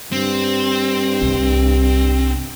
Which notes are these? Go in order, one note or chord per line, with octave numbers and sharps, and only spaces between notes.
G2 C4
C2